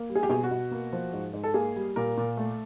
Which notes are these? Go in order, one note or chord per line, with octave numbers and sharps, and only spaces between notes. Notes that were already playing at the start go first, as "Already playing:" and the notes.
Already playing: A#3
G3
G#4
G4
B2 G#4
F#4
B2
A#3
F3
G#2
G#2
A4
A#3 G#4
G3
A#2 A#4
A#2
A3